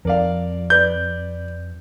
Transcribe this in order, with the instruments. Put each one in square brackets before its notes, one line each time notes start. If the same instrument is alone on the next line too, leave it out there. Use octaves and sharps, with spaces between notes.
[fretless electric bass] F2 [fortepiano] A#4 D5 F5
[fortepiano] B4 D5 [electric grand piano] G6